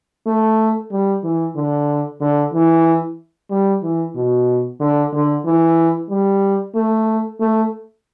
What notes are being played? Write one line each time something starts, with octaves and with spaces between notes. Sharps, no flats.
A3
G3
E3
D3
D3
E3
G3
E3
B2
D3
D3
E3
G3
A3
A3